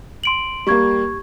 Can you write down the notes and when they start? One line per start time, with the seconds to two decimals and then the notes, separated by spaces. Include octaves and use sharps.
0.24 C6 D7 F#7
0.67 G3 A#3 G4 C#6 G#6